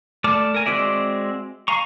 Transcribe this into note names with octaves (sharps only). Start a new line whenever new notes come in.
A3 D5 A5 D6 F6
A#4 G#5
G#3 C4 F#4 D5 E5
F5 G#5 A#5 C#6